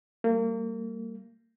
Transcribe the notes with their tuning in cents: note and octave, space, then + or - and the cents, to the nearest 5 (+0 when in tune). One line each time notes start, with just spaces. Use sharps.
G3 -5 A#3 -35